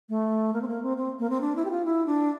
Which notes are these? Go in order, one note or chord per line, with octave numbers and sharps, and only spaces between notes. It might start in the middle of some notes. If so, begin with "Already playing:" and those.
A3
A#3
C4
A#3
C4
C4
A#3
C4
D4
E4
G4
F4
E4
D4